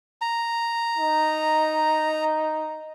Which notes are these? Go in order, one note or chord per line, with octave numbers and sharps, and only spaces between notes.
A#5
D#4